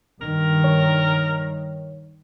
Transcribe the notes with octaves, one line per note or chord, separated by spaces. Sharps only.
G2 D#3 A#4
C#5